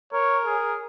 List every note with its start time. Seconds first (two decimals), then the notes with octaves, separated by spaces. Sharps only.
0.13 A#4 C#5
0.46 G#4